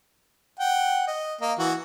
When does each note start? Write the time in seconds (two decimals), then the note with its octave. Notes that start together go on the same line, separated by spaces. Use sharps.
0.60 F#5 G5
1.07 D#5
1.41 A#3 D#5
1.59 E3 F#4